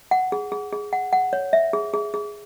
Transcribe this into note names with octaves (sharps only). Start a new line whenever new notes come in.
F#5
G#4
G#4
G#4
F#5
F#5
C#5
E5
G#4
G#4
G#4